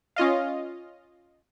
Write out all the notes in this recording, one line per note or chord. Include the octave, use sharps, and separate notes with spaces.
C#4 F4 D#5 F5